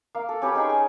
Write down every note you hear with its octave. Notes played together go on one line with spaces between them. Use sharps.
A#3 F5
A4
C#4 G4 B4 B5
D#4 G#4 G5 C#6
G#4